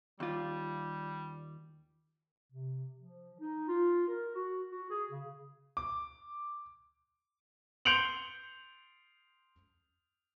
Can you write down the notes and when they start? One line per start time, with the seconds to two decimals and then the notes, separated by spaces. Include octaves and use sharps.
0.20 D#2 G3 F4
2.53 C3
2.99 F3
3.39 D#4
3.68 F4
4.07 A#4
4.35 F#4
4.71 F#4
4.90 G#4
5.11 C#3
5.77 D6
7.85 C6 G6 C#7 D7 F7 F#7